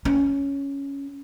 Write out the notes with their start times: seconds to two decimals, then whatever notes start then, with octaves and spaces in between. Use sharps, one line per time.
0.05 C#4